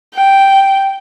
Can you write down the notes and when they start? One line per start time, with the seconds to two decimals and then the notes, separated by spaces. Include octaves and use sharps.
0.15 G5